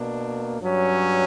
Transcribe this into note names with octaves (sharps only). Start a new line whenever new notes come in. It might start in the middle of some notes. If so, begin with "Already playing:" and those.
Already playing: B2 A#3 D4
G2 F#3 C#4